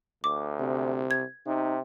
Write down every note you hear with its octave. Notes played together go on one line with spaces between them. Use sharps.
D2 D6
C3
G#6
C3 D#4